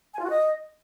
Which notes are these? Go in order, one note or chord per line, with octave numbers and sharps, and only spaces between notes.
G#5
F4
F#4
D#5